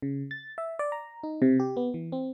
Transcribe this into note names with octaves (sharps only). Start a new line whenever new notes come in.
C#3
A6
E5
D5
A#5
D#4
C3
G4
B3
E3
C4